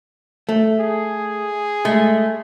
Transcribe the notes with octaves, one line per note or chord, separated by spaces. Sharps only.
A3
G#4
G#3 A3